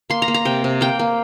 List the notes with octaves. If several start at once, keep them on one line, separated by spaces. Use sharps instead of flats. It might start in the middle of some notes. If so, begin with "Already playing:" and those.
A#3 C6
A#5
A#3
A#5
C3 G5
C3
A#3 G5
A#3